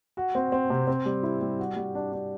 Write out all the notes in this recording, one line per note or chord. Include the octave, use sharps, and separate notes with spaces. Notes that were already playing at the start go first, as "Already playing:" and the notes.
F#4
C4
C4
C3
C4
G3
E4
G3
F#4
G3
D4
D4